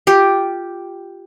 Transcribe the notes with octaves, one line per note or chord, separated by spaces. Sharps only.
F4 G4